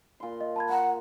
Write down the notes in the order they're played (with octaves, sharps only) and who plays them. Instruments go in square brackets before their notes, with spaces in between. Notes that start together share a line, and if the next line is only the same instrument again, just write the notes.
[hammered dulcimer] A#2 C6
[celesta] D#5
A5 B5 G#6
[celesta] F5 A#5 [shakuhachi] F#5